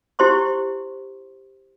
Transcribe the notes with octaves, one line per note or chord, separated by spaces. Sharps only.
E4 G4 C5 C6 C#6